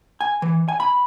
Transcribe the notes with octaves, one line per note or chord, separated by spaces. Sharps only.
G#5
E3
G#5
B5